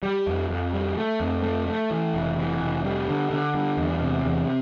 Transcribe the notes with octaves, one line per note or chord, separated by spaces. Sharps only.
G3
F2
F2
G3
A3
F2
A3
A3
E3
F1
E3
F1
G3
D3
D3
G2
E2
C3
E2